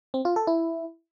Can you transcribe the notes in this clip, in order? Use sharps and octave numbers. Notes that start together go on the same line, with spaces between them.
C4
F4
A4
E4